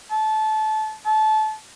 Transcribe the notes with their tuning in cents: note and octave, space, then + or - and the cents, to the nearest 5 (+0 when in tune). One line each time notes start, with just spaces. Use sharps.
A5 -20
A5 -25